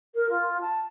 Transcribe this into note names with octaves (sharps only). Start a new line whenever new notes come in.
A#4
F4
A5